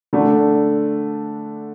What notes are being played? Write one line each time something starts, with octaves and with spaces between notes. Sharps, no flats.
D3 A3 D4